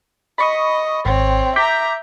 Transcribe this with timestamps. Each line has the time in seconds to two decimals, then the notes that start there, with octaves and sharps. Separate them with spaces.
0.38 D#5 B5 C#6 D#6
1.05 G#1 C4 C#5
1.56 E5 A#5 D6 G6 B6